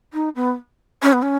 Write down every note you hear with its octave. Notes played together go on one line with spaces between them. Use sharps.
D#4
B3
C#4
B3
C#4